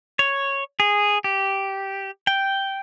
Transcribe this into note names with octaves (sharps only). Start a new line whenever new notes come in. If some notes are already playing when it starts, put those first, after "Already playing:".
C#5
G#4
G4
G5